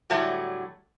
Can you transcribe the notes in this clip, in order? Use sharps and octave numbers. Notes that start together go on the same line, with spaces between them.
A2 D3 F#3 G3 A3